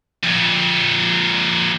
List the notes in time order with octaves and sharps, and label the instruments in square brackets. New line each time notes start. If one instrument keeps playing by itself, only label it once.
[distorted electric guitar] F2 A#2